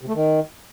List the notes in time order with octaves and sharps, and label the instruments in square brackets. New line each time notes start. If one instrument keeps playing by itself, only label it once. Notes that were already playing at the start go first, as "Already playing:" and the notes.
[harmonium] C3
A3
D#3